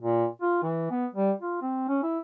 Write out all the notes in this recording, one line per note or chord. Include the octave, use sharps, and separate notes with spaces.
A#2
F4
E3
B3
G3
F4
C4
C#4
E4